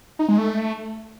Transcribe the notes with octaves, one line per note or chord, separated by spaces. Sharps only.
D#4
G#3
A3